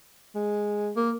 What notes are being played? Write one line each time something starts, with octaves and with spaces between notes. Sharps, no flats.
G#3
A#3